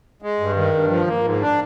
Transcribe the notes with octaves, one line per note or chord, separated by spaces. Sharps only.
G#3
G2
D#3
G2
F3
A#3
G#2
D4